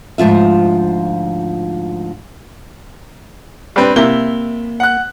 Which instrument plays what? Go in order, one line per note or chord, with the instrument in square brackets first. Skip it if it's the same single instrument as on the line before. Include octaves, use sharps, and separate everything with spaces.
[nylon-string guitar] D2 G#2 F3 F4 E5
[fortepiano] G3 C4 [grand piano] D4 B4
[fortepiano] C3 E4 [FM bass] A#3 [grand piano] G7
[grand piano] F#5 F#6